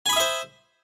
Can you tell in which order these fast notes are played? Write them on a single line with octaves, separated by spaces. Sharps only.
G#5 B5 D#6 E5 C5